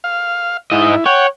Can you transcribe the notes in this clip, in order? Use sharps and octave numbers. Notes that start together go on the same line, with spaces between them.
F5
G#2 E4 D#5
C#5 F#5 G5